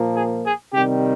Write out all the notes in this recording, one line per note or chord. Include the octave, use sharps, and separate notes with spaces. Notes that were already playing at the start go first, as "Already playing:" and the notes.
Already playing: A#2 F3 A#3
G#4
G#4
C3 D#3 G3 G4